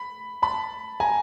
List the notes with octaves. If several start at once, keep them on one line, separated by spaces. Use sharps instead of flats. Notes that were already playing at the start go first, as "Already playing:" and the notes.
Already playing: B5
A5 B5
G#5 A#5